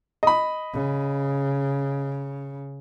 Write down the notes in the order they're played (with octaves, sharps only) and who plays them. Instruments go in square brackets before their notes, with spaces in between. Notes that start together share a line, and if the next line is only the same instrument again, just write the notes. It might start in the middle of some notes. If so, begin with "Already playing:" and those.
[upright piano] D#5 B5
[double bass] C#3